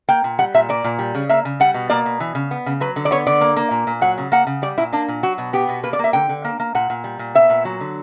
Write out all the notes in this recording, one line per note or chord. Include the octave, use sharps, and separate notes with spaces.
A#3 G5
A#2
G3 F#5
A#2 E5
A#3 D5
A#2
G3
C#3
A#3 E5
C#3
G3 F#5
B2
A#3 D5
B2
E3
C#3
B3
C#3
F#3 B4
D3
D5
B3 C#5
D3 D5
A#3
A#3
A#2
A#2
F#3 F#5
C#3
A#3 F#5
C#3
G3 D5
A#2 E4
A#3 D4
A#2
F#3 F#4
B2
B3 G4
B2
A#3 B4
D5
A#3 E5
D3 G5
D3
A#3
A#3
A#2 F#5
A#2
G3
A#2
B3 E5
A#2
F#3
D3